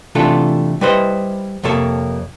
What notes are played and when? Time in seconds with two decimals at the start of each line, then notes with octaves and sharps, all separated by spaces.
0.15 C3 E3 A3 D4 F4 A4
0.81 G3 E4 B4 C5 D#5
1.64 F2 C3 A#3 A4 C#5